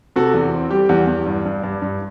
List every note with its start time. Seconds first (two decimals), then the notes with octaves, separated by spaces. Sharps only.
0.16 C3 F#4 A4
0.34 E2
0.53 C4
0.70 G3 G4
0.89 E2
1.07 E2
1.26 G2
1.45 G2
1.63 G2
1.82 G2